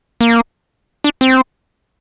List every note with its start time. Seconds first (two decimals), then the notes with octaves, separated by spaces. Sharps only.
0.21 A#3
1.04 D4
1.21 C4